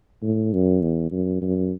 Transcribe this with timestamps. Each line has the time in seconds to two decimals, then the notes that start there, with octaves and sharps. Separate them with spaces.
0.23 A2
0.53 F#2
0.82 E2
1.11 F#2
1.42 F#2